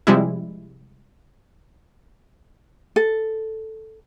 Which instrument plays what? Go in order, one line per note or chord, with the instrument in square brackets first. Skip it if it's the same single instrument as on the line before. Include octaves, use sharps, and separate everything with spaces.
[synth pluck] C3 F3 G3 G#3 E4
[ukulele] A4